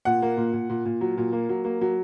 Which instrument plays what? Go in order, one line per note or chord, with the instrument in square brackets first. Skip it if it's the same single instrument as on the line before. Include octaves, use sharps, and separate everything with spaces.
[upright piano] A#2 F#5
A#3
A#2
A#2
A#2
A#2
F#3
A#2
A#3
F#3
A#3
F#3